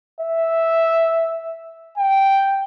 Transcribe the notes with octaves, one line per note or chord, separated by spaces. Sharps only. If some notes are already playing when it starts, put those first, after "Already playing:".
E5
G5